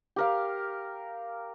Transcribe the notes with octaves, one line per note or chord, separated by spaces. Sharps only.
G4 A#4 F5